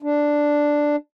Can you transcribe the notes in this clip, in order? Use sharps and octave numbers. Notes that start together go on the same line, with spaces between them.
D4